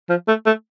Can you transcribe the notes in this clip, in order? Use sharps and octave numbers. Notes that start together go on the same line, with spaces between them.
F3
A3
A3